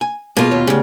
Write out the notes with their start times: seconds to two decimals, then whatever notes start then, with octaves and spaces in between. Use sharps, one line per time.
0.01 G#5
0.37 B2 A#3 F4 G#4
0.51 D#2 C#5
0.67 D2 C#3 G4